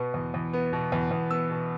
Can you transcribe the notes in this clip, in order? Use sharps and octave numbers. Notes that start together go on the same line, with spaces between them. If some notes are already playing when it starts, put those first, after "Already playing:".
Already playing: B2 B3
E2
E2
B3
B2
E2
E2
B3 E6
B2